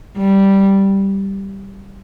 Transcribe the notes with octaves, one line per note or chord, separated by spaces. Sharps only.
G3